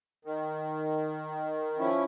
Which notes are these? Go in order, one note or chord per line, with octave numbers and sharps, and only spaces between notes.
D#3
F3 C#4 E4